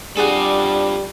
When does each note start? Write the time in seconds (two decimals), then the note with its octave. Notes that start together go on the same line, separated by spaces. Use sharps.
0.17 G3 D4 F4 G#4 A4 D5 F#5